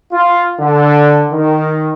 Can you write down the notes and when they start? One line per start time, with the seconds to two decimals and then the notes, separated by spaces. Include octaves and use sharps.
0.13 F4
0.60 D3
1.31 D#3